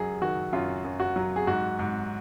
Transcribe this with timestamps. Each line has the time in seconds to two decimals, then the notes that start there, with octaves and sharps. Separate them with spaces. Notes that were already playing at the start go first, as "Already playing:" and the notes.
Already playing: F#2 F#3 G#4
0.22 D#3 F#4
0.53 F#2 F4
0.84 F#2
1.00 F#4
1.16 F#3
1.36 G#4
1.47 G#2 F#4
1.79 G#2